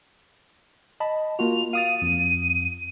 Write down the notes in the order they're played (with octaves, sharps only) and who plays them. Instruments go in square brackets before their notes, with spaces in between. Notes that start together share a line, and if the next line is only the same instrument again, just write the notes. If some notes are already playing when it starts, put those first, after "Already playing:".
[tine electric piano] D#5 A5 B5
[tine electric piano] A#3 F4 F#4 [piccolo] F7
[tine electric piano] F5 D#6 A6 [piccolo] D#7
[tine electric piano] F2